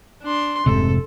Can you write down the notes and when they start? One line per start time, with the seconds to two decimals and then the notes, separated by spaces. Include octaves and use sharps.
0.22 D4 C6
0.66 F1 G#2 C3 A4